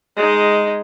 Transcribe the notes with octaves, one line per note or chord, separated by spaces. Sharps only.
G#3 D#4